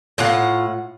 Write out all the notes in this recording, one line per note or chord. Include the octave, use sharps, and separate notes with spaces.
A2 F4 F5 F#5